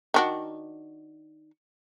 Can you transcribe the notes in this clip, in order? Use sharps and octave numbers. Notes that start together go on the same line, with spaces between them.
D#3 D4 F#4